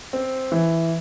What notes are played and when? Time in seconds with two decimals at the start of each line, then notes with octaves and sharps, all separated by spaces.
0.13 C4
0.52 E3